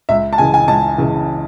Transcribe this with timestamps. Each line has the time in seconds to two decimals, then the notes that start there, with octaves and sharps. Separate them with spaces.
0.09 C#2 E5
0.33 A5
0.38 C#3 E3 G#5
0.54 G#5
0.68 C#2 A5
0.98 C#3 E3